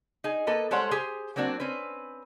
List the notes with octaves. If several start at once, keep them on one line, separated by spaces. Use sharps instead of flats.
D#4 G#4
A#3 A4 B4 D#5
G3 G#3 A4 C5 C#5 F#5
G4 G#4 C5
F#3 A#3 C4 D4 F#4
C4 C#4 B4